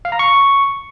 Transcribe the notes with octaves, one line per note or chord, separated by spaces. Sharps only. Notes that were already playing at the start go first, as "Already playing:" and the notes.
F5
A#5
C#6